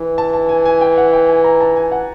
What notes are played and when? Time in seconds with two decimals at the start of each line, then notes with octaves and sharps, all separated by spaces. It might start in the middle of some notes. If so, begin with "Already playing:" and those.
Already playing: E3
0.18 A5
0.34 A5
0.49 G#5
0.65 G#5
0.81 G5
0.98 F#5
1.13 G5
1.29 G#5
1.44 A#5
1.61 A5
1.76 G#5
1.92 F#5